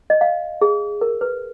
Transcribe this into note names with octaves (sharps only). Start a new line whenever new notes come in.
D#5
F5
G#4
A#4
B4